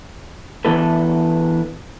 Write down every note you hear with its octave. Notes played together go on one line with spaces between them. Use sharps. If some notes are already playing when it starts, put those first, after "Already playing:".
E3 B3 D4 E4 A4 B4